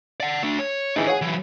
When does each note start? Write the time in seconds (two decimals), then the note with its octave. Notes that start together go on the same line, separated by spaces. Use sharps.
0.20 D5 F#5
0.43 A3 D4
0.59 C#5
0.96 E3 D4 D#4 G#4
1.07 G#4 C#5 F#5 G#5
1.22 E3 F#3